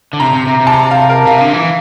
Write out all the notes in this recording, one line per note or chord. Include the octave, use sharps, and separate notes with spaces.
D3
C3 A#5
C3
C3
C3
A5
A#5
F5
A#4
C3 F5
D3
E3